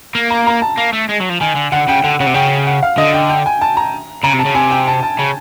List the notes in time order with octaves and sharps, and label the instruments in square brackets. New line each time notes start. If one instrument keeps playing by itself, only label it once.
[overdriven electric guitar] A#3
[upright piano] A#5
A#5
A5
[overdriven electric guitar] A#3
A3
G#3
F#3
F3
[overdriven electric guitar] D#3 [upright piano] G#5
[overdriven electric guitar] D3
[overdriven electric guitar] D3 [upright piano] F#5
[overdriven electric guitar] C#3 [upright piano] G5
[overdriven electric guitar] D3 [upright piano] F#5
[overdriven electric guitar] C#3 [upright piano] F#5
[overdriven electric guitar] C3
[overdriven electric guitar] C#3 [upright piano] G5
[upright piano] F#5
F5
[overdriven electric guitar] D3 [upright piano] D#5
[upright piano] G5
G5
G#5
A5
A#5
[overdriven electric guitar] C#3 [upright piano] A#5
[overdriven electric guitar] C3
[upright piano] A5
[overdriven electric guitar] C#3
[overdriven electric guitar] C3 [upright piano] G#5
[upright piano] G5
A5
A5
[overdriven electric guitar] C#3